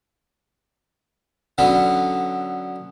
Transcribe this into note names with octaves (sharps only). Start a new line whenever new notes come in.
D3 F#3 B3 C#4